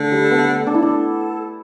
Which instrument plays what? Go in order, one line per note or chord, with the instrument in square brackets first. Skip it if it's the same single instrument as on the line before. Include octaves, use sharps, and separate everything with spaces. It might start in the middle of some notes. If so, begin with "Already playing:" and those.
Already playing: [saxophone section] D3 [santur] A3
[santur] G3
[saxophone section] A4
[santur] B3
A3
[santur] D4 [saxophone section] A4
[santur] E4
D4